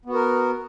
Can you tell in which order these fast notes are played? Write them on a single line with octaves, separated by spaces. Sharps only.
B3 F#4 A#4